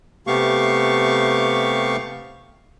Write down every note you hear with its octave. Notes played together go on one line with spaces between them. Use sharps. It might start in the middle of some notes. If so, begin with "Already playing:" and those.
C3 A3 B3 G4 F5 C#6